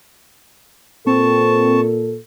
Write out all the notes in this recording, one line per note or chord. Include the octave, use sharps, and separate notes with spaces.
A#2 C4 A4 A5 C#6